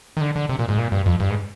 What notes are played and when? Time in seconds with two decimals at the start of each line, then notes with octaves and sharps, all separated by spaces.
0.17 D#3
0.21 D3
0.36 D3
0.49 C3
0.59 A#2
0.69 G#2
0.78 A#2
0.92 G2
1.06 F2
1.20 G2
1.30 G#2